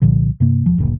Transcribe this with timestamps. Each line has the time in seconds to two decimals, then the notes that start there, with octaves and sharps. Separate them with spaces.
0.02 C2 A#2 D3 F3
0.40 G2 C3 A#3
0.66 E1 F3
0.78 F#1 D2 A#2